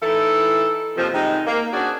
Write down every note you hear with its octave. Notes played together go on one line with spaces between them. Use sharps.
E3 D#4 E4 A4
D#2 C3 D#3 F3
C3 D#3 G3 G#3 D#4
A#3
C#4 D4 F#4 G#4 C5 D5